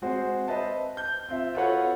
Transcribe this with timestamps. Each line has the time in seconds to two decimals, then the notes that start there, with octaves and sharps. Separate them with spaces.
0.02 G#3 C4 F#4 G#4 C5
0.48 B4 C5 D#5 E5 A5
0.97 G6
1.29 C4 F4 E5
1.55 F4 F#4 A4 B4 C#5 F#5